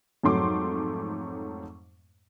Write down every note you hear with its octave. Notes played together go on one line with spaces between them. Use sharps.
F2 G#2 F#3 A3 C6 D6